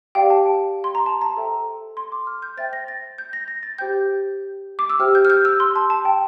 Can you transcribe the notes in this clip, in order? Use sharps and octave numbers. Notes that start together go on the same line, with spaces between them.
G4 D5 F5 G5
A5
C6
A#5
A5
A#5
A4 C5 E5 G5
C6
D6
F6
G6
C5 E5 G5 A6
A#6
A6
G6
A#6
A#6
A6
G4 C5 G5 G6
D6
E6
G4 C5 E5 G5 F6
G6
F6
G6
E6
C6
A5
A5
G5